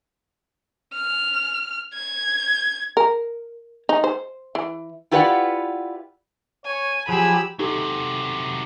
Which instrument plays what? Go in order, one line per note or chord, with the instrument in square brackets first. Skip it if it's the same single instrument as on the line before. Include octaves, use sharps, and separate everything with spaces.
[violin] F6
G#6
[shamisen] A#4
D#4
C5
E3
[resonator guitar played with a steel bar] E4 F4 G4 B4 D5 F#5
[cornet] C#5 [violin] G#5
[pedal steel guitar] F3 F#3 [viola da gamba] G4 [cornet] G#4 [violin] B5 E6
[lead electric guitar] C3 F#3 [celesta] D#4 G4 A4